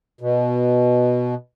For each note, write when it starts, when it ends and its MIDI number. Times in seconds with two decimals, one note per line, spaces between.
0.21 1.35 47